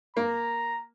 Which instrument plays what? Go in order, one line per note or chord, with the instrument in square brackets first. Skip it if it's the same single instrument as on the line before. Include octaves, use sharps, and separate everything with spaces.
[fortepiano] A#3 [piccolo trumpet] A#5